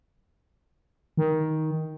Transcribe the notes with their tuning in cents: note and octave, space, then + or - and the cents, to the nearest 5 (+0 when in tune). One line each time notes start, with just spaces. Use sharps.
D#3 +10